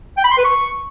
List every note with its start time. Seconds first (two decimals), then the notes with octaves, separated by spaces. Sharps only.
0.18 G5
0.24 B5
0.31 C6
0.38 B4
0.45 C#6